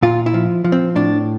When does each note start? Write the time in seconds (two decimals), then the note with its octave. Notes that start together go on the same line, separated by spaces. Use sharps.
0.03 A#2 F4
0.26 E4
0.34 F3
0.64 F3
0.72 C4
0.96 A2 D4